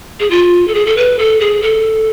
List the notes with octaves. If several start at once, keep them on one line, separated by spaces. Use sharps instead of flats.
G#4
F4
A4
G#4
A4
B4
A4
G#4
A4